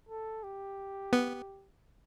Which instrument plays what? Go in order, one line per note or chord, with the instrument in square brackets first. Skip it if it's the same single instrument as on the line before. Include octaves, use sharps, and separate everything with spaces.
[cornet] A4
G4
[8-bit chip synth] B3